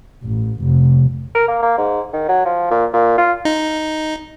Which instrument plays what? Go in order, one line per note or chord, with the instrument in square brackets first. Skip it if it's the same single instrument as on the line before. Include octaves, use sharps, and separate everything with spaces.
[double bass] A1
F1
[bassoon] A#4
A#3
A#3
G#2
D#3
F#3
F3
A#2
A#2
F4
[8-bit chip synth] D#4